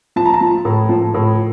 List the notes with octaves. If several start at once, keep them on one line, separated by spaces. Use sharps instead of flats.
F3 A5
A#5
A5
F3
A2
F3
A2